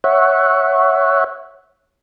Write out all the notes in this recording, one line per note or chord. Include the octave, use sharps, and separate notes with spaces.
C#5 E5 F#5